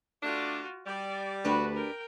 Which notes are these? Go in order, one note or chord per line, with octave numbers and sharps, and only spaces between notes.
A3 D4 F4 F#4
G3 D5
D2 D4 F#4 G4 B4
A#4 G5